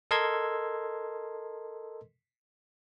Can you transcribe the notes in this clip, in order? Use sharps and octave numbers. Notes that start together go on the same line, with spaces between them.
A4 A#4 D#5 C6 E6 G#6